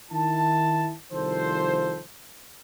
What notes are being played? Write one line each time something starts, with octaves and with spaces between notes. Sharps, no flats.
D#3 E4 A5
C2 D#3 F3 F4 A4 C5